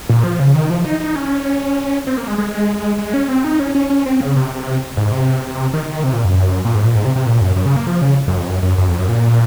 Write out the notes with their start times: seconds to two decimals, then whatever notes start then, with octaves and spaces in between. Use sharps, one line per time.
0.09 A#2
0.24 F3
0.39 C#3
0.54 D#3
0.70 F3
0.85 D#4
1.00 D#4
1.16 C#4
2.07 C4
2.17 A#3
2.27 G#3
2.38 G#3
2.99 G#3
3.14 C#4
3.29 C4
3.44 D#4
3.60 C#4
3.75 C#4
3.90 C#4
4.06 C4
4.21 C#3
4.36 C3
4.97 G#2
5.12 C3
5.73 D#3
6.03 C3
6.13 A#2
6.25 F#2
6.65 A#2
6.75 G#2
6.85 A#2
6.95 G#2
7.05 C3
7.16 C3
7.26 A#2
7.41 F#2
7.56 F#2
7.66 C#3
7.76 A#3
7.87 F3
8.02 C#3
8.28 F#2
8.38 F2
8.47 F#2
8.63 F#2
8.78 F#2
8.88 F2
8.99 F#2
9.09 A#2